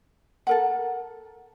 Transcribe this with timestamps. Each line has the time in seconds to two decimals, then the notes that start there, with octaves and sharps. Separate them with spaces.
0.47 A4 A#4 F#5